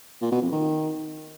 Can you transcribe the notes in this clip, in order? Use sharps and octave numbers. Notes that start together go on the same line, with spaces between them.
A#2
B2
F2
D#3